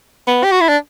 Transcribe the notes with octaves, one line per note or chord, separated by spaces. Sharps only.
B3
G4
F#4
E4
D4